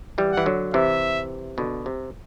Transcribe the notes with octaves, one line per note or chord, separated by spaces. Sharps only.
E3 G3
F#5
E3
D3 F#3
C3 E3 E5
B2 D3
C3